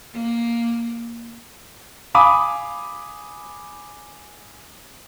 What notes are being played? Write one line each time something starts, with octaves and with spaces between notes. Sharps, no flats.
A#3
F5 G#5 B5 D6 D#6